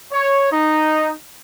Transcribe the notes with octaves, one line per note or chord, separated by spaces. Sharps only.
C#5
D#4